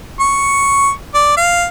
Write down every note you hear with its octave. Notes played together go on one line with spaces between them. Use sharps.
C#6
D5
F5